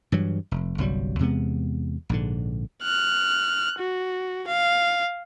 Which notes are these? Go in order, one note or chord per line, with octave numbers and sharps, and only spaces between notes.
G2 E3 F#3
F1
G1 C2 F#3 G3
E2 C3 G#3 B3
A#1 G#2 D3
F6 F#6
F#4
F5